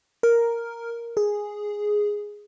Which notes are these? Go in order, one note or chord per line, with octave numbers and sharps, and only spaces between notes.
A#4
G#4